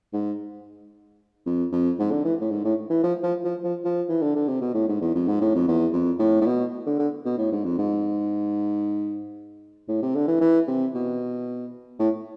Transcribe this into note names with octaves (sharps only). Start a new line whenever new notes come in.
G#2
F2
F2
G#2
D3
E3
A2
G#2
A2
E3
F3
F3
F3
F3
F3
E3
D3
D3
C3
B2
A2
G#2
E2
F2
G#2
A2
F2
E2
F2
A2
A2
B2
D3
D3
B2
A2
G#2
F2
G#2
A2
C3
D3
E3
E3
C3
B2
A2